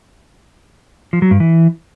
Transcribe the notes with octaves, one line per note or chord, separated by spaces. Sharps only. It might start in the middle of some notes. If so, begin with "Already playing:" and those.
F3
F#3
G2
E3